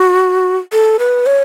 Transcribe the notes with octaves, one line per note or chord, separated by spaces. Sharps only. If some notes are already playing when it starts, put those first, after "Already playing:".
Already playing: F#4
A4
B4
C#5